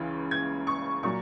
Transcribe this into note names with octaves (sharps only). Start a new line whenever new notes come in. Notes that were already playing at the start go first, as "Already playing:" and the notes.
Already playing: C#2 C#3 E3
G#6
C#6
A#2 F#3 C#6